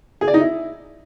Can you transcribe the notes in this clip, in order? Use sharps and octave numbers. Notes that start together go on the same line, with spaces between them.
G#4
D5
D#4
E4